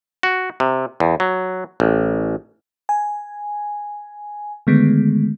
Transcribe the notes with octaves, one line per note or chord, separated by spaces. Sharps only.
F#4
C3
E2
F#3
A1
G#5
D3 D#3 G#3 A3 B3